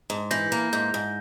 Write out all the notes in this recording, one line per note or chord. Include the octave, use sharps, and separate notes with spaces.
G#2
E3 G6 A#6
A#3
G#2 G6
G#2